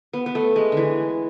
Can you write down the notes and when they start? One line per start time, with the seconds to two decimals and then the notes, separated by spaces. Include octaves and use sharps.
0.13 B3
0.26 B3
0.35 A3
0.56 G#3
0.72 D3 E3